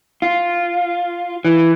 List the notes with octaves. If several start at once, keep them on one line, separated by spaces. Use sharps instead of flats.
F4
E3